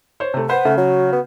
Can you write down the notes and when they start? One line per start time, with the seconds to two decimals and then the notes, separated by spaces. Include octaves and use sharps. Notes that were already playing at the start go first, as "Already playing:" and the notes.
0.20 C5 C#5
0.34 C3 A3
0.49 B4 C5 F#5
0.65 C#3 A3
0.77 F#3 F#4
1.13 B3